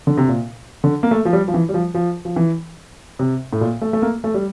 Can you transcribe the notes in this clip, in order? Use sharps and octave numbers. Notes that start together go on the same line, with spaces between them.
D3
C3
A#2
D3
A#3
A3
F3
G3
F3
E3
G3
F3
F3
F3
E3
C3
A2
A#2
A3
A3
A#3
A3
G3